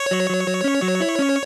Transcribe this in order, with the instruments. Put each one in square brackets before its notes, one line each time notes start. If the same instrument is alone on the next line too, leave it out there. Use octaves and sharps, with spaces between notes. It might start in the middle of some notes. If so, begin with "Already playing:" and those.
Already playing: [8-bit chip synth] C#5
[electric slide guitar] F#3
F#3
F#3
C#4
F#3
E4
C#4